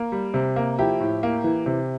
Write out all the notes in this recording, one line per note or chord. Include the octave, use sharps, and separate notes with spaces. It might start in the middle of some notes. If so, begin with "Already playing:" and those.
Already playing: A#3
G3
C3
A#3
F3 E4 G4
A2
A#3
E3
C3